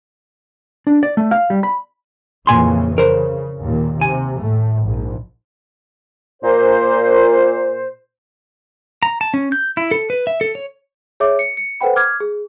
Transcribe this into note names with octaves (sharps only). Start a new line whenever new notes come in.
D4
D5
A3
F5
G3
B5
F2 A#2 C#3 E3 G#5 C6
C#3 A#4 C5
D#2 A#2
C3 G#5
A2 A3
A#1 G#2
A#2 C5
A#5
A5
C#4
G6
E4
A4
B4
E5
A4
C#5
G#4 C#5 E5 D6
C#7
C#7
A4 B4 C5 F#5 G5 B5
D6 F6 G#6
G#4